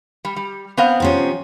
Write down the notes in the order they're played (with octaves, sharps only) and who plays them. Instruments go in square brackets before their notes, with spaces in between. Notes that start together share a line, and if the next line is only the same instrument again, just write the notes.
[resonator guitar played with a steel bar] G3
G3
B3 C4 F5
[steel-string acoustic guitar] C3 F3 C#4